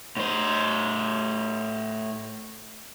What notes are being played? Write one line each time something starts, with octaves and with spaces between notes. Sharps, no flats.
A2 C5